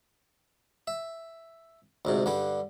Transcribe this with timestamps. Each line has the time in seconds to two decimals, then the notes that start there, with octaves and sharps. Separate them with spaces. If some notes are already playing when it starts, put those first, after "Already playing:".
0.87 E5
2.05 D2 G#2 C3
2.26 G2 D3 G3 G#5